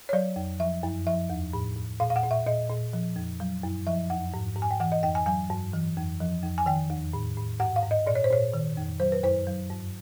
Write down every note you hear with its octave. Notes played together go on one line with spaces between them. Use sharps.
C#5
F#3 D5
F2
F3 E5
F#2
F3 E5
E2
A2
A2
A#2 F5
F5
F#5
A#2
E5
A#2 D#5
A#2
F3
F2
F#3
F#2
F3 E5
F2 F#5
G#2
G#2
G#5
G5
E3 F#5
D#5
F2 G5
G#5
F#3 G#5
G2
E3
F2
F3
F2
G#5
D#3 G5
E2
A2
A2
G#2 F#5
F5
G#2
D#5
A#2 D5
C#5
C5
A#2 C#5
D#3
F2
F#3 C5
B4
F#2 C5
F#3
G2